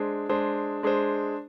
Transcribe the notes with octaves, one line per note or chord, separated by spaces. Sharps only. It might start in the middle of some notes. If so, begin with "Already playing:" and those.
Already playing: G#3 D4 G#4 C5
G#3 D4 G#4 C5
G#3 D4 G#4 C5